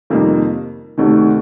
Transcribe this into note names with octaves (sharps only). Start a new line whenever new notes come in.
F2 C3 D#3 G3 A#3
D2 C3 D#3 A3